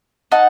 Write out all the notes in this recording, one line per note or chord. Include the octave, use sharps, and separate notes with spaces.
D#4 F#5 A5